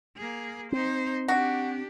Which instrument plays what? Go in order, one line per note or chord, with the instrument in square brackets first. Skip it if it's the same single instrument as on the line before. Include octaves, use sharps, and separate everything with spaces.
[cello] A#3 G#4
[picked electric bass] C4 [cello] D#4 C5
[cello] D4 G4 [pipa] F#4